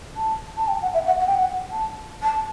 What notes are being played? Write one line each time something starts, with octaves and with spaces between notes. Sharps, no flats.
A5
A5
G5
F#5
E5
F#5
F#5
G5
F#5
A5
A5